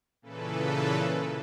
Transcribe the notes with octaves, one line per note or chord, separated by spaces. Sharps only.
A#2 C#3 E3 A4 B4